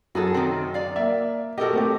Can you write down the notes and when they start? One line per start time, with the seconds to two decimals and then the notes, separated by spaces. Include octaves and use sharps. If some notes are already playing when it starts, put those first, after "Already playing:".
0.15 F#2 F#3 F#4 G#4 A4
0.34 D#3 C4
0.74 D5 F5
0.96 A#3 E5
1.58 F#4 G4 A4 A#4 D#5
1.73 A3 C4 G4